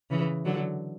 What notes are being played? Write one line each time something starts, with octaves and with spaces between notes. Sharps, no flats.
C#3 E3
D3 F#3